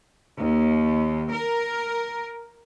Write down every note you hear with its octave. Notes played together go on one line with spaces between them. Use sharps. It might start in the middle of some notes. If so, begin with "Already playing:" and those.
D#2
A#4